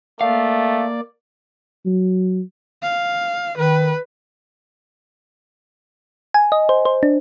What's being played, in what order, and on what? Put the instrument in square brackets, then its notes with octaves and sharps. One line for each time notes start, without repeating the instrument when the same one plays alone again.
[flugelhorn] A3 [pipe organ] A#3 D5 [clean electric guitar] F5
[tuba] F#3
[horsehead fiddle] F5
[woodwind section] D#3 [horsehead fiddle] B4
[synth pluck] G#5
D#5
C5
C5
D4